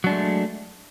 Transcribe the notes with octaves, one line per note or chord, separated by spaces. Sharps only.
F#3 G#3 A3 D4